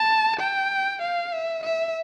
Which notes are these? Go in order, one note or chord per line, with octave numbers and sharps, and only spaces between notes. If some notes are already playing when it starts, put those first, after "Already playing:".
Already playing: A5
G5
F5
E5
E5